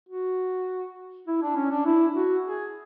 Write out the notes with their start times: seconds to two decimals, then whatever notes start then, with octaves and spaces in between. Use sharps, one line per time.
0.09 F#4
1.27 E4
1.42 D4
1.56 C#4
1.71 D4
1.86 E4
2.16 F#4
2.46 G#4